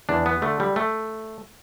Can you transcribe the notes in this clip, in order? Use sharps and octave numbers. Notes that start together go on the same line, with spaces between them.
E2 D4
B3
D3 A3
G3
A3